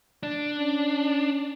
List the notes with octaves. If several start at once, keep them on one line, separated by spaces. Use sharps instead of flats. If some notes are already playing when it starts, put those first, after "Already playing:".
D4
C#4